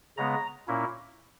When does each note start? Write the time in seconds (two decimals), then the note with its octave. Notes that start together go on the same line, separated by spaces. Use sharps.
0.17 C#3 G#3 B3 A#5
0.68 A#2 A#3 C#4 E4